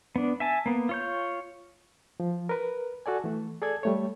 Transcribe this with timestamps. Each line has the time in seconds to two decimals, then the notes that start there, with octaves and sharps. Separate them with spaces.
0.16 B3 D4
0.40 E5 G#5 A5
0.66 A#3 B3
0.89 F4 C#5 G6
2.20 F3
2.49 A#4 B4
3.06 F#4 A4 D5 G#5
3.24 E3 A3
3.62 G#4 A4 D5 G#6
3.83 G3 A3 C#5